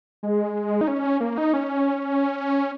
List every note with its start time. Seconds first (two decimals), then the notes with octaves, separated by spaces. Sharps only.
0.23 G#3
0.81 D#4
0.88 C#4
1.20 A#3
1.38 D#4
1.53 C#4